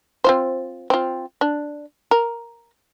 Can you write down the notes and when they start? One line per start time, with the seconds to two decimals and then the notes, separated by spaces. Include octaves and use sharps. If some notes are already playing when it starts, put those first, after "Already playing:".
0.24 C4 F4 C5
0.90 C4 F4
1.41 D4
2.11 A#4